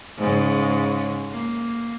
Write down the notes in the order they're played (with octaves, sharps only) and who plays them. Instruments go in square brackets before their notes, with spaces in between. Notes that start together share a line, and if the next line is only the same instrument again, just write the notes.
[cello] G#2 C#3
A#3